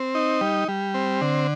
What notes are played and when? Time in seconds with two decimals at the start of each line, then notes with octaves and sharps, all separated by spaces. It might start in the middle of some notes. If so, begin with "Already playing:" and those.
Already playing: C4
0.15 D#4
0.41 G3
0.68 G3
0.94 C4
1.21 D3